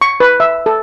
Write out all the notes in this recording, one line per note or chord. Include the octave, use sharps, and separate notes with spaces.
C#6
B4
E5
A4